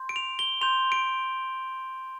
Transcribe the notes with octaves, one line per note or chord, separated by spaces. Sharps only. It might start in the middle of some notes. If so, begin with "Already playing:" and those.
Already playing: C6 G6
D7
F7
G7
C6 G6 F7
D7